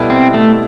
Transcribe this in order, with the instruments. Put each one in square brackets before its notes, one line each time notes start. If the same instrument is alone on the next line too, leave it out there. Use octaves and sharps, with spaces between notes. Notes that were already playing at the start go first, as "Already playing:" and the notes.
Already playing: [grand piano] B2 G3 B3 E4 A4
[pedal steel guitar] C4
A3